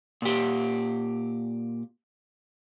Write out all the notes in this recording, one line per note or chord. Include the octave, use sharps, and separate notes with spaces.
A#2 G4